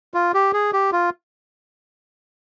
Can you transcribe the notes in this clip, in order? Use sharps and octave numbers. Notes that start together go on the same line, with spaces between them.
F4
G4
G#4
G4
F4